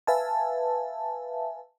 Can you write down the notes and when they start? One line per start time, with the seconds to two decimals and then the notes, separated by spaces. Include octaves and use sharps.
0.07 B4 E5 F5 G#5 A5